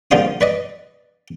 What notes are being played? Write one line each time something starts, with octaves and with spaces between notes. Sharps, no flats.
A#1 D3 G3 C5 F5 D#6
B4 D5 D#5